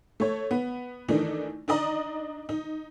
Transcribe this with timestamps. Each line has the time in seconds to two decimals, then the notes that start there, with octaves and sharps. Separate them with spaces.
0.20 A3 C#5
0.51 B3
1.09 D#3 E3 A3 D4 D#4
1.68 D4 D#4 D5 D#5 A#5
2.49 D#4